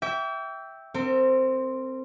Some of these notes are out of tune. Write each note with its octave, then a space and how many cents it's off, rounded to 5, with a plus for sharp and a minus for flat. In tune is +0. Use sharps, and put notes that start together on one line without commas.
E5 -5 G5 +0 D6 -45
C4 +0 A#4 -40